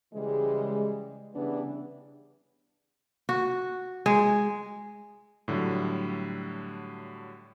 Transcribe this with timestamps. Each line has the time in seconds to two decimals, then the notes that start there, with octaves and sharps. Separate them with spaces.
0.13 C#3 E3 G3 G#3
1.35 C#3 E3 G3 B3 D4
3.29 F#4
4.06 G#3
5.48 A2 D3 F#3 G3 A3